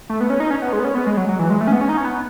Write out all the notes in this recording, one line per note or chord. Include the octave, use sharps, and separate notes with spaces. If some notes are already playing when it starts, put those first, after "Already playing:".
A3
B3
C#4
D#4
C#4
B3
G#3
B3
C#4
B3
G#3
F#3
F#3
E3
G#3
A3
C#4
B3
C#4
D#4
C#4
B3